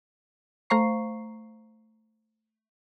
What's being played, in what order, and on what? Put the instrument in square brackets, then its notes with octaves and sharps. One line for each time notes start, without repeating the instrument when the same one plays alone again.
[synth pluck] A3 C5 F5 A#5 C#6 C7